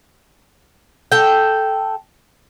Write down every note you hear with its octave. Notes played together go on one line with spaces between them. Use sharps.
A4 G5